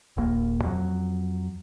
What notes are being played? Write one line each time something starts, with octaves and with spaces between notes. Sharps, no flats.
D#1 A#1 A#3
F2 F#3